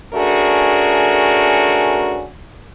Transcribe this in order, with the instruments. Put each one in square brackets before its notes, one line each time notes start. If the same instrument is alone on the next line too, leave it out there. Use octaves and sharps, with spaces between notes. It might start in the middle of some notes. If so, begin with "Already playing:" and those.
[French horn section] A3 C#4 D4 F#4 G#4 A#4